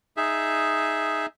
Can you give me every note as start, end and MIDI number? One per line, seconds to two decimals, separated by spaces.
0.17 1.26 63
0.17 1.26 68
0.17 1.26 76